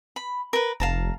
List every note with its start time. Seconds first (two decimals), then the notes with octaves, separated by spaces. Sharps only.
0.16 B5
0.53 A#4 B4
0.80 F1 F5 A5 A#5